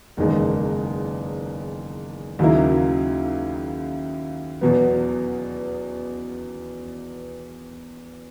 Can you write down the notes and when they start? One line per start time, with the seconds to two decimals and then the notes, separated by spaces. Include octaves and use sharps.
0.17 F#1 E2 D#3 G#3
2.39 D#2 C#3 F#3 A#3 E4
4.61 E2 B2 F#3 B3